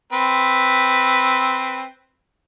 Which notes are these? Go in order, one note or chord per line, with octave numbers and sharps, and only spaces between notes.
C4 B4